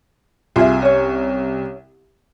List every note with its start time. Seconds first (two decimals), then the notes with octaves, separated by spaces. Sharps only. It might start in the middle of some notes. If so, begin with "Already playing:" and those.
0.56 C2 F4 G#4 E5
0.82 C#4 C#5